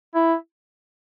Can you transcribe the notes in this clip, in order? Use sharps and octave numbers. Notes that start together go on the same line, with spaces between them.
E4